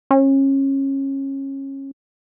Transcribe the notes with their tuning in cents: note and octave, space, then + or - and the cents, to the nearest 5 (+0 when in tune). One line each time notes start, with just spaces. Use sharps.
C#4 -25